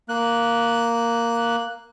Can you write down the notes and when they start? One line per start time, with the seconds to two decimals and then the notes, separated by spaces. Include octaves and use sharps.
0.09 A#3 F#6